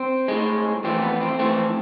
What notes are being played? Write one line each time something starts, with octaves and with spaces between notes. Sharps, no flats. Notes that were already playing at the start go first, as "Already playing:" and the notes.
Already playing: C4
A2 G#3
F2 E3 A3 C4
B3
C4
F2 E3 A3 C4